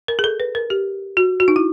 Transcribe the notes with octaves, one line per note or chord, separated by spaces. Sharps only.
A#4
G#4
A4
B4
A#4
G4
F#4
F#4
D#4
E4